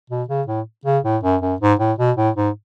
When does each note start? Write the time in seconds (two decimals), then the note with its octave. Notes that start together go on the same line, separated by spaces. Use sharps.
0.10 B2
0.29 C#3
0.47 A2
0.85 C#3
1.04 A2
1.23 F#2
1.42 F#2
1.61 G#2
1.79 A2
1.98 B2
2.17 A2
2.36 G#2